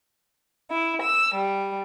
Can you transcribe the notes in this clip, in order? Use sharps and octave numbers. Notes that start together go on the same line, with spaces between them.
E4
E6
G3